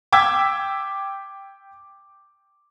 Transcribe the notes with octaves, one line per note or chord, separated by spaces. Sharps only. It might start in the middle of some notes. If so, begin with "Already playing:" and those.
G5 D6 E6 G#6 B6